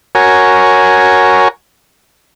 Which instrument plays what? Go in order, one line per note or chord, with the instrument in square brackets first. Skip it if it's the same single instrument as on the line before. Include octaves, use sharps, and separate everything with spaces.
[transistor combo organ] F#4 A#4 C#5 G#5